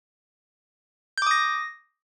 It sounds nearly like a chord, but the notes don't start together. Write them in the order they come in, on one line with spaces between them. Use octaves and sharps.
G6 D6 D#6 A#6